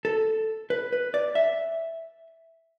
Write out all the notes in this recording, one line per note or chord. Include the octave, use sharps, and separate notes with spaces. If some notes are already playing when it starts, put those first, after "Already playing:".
A4
B4
B4
D5
E5